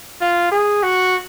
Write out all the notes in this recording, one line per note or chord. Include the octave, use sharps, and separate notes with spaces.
F4
G#4
F#4